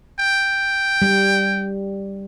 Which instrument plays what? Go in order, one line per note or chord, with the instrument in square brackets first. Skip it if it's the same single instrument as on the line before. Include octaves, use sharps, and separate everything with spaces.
[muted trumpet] G5
[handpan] G3